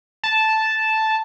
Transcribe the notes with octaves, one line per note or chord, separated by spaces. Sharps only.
A5